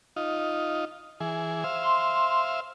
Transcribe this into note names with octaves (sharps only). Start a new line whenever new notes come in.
D#4 F4
E3 G#4
C5 E5 F5
C6